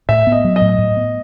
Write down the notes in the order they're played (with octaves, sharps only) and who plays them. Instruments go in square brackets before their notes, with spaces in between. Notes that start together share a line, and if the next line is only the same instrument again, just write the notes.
[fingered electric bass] A2 [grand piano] E5
[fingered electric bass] B3
[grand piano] D#5
[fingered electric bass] F#3
[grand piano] D#5
[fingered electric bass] A2
A2
B3